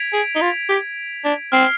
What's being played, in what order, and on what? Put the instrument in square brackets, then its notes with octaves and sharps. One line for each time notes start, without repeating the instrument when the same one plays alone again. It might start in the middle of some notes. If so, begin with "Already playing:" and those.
Already playing: [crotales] G#6 B6 D7 F7
[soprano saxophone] G#4
D#4
F4
G4
D4
[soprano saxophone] C4 [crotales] F6 C7 G7